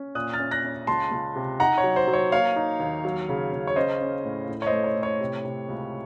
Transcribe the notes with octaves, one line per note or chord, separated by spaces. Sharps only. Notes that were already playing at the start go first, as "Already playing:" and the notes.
Already playing: C#4
A#2 D#6 F#6
F6 A6
C#4
F#6 A#6
C#4
C#2 A5 C6
C#2
C3
D#4 F#5 A#5
C#5
F#3
C5
F#3
C#5
A#3 C#5 F5
D#4
D#2
F#3
C#3
C#3
C#5
C#4 C5 D#5
C#4
A2
A2
C#5
C5 D#5
A3
C#5
A2
C#5
C3
C3
C#2